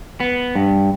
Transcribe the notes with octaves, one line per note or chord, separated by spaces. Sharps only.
B3
G2